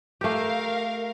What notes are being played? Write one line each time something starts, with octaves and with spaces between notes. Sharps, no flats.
A3 G4 A#4 F5